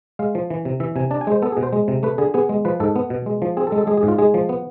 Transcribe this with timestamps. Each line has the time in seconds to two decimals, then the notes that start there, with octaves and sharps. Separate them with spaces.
0.19 G#3 F5
0.35 F3
0.50 E3
0.65 C3
0.80 E3 E5
0.96 C3 G#5
1.11 D4 A5
1.21 G#5
1.27 G#3 C5
1.42 B3 A4
1.52 G#4
1.57 B2
1.63 C5
1.73 G#3
1.88 C3
2.03 A3 B4
2.18 D3 G#4
2.34 B3 G#4
2.49 G#3
2.65 F3 B4
2.80 G#2 A4
2.96 B3
3.10 B2
3.26 G#3
3.42 F3
3.57 C4 G#4
3.67 A4
3.72 G#3
3.78 A4
3.87 G#3 G#4
3.97 G#4
4.03 G#2
4.08 F4
4.18 G#3 G#4
4.34 F3
4.49 B3